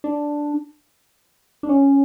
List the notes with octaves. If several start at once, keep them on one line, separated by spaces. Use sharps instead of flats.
D4
D4
C#4